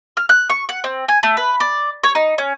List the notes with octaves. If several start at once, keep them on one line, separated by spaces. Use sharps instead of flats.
F6
F#6
C#6
F#5
C4
G#5
A3
B4
D5
C#5
D#4
C#4